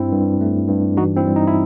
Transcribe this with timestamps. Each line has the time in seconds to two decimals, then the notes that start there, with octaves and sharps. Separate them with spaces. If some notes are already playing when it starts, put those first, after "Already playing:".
Already playing: G2 C4 E4
0.12 G2
0.41 A3
0.69 G2
0.97 E3 D#4 F#4
1.16 C4 E4
1.27 G3
1.36 D#4
1.47 E4